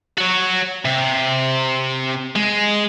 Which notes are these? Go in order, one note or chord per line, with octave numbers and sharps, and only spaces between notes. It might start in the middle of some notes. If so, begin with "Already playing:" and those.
F#4 C#5
C3
G#3